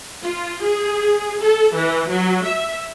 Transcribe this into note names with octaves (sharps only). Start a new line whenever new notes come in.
F4
G#4
A4
E3
F#3
E5